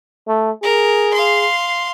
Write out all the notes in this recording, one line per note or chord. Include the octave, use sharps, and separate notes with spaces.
A3
G#4 A#4
F5 C6